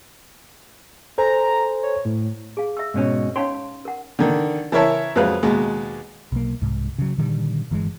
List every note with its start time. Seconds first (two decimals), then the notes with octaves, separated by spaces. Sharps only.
1.18 A4 C5 G#5 A#5
1.83 C#5
2.05 A2
2.57 G#4 F5
2.77 E5 E6
2.94 G#2 B2 C#4
3.36 C#4 D#4 C#5 F5 G5 C6
3.85 A#4 F#5
4.19 D3 D#3
4.72 E3 E4 A#4 C#5 E5 A5
5.15 F2 F#3 G#3 B4 F5 F#6
5.43 D#2 B2 G#3
6.32 B1 A#3
6.62 C2 G#2
6.98 C#3 F#3
7.18 A#2 D3 D#3 G3
7.71 G1 E3 G#3